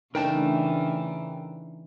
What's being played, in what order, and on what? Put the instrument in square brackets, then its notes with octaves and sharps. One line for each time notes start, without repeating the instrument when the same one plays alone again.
[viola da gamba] C#3 E3 [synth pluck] A3 D4 D#4 [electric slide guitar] A#4 G5 A5